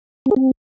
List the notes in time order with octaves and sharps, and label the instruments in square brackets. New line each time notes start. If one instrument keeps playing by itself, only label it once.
[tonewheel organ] C4
G#4
C4